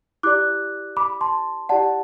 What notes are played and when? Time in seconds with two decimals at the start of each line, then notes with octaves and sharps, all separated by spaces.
0.23 E4 G4 D5 D6 F#6
0.97 B5 D6
1.21 A5 C6
1.69 E4 G4 D5 F#5 A5